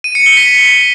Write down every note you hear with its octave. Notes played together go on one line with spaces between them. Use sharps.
D#7
C#7
G7
B6